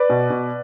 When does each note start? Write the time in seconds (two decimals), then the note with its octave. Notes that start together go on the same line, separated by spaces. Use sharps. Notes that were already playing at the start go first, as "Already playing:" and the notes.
Already playing: B4 D5
0.10 B2
0.30 B2